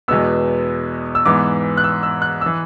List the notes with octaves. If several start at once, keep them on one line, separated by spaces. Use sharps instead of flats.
E2 B2 G#3 B3 E6
E6
G#2 E3 B3 D6
F#6
E6
E6
F#6
E3 E6